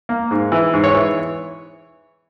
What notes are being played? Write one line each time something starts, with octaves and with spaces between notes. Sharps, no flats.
A#3
G#2
E3
G#2
C#5
E3